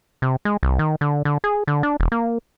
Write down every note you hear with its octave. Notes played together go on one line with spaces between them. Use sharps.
C3
G#3
C2
D#3
D3
D3
G#4
D3
D4
E1
A#3